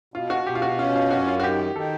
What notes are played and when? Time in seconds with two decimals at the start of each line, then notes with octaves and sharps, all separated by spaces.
0.14 B2 F4
0.30 F#4
0.46 B2 G4
0.55 F4
0.62 F#4
0.78 C#4 F4
0.96 F4
1.11 F#2 F#4
1.28 F4
1.40 F#4
1.43 D#3 G4
1.75 D#3 A4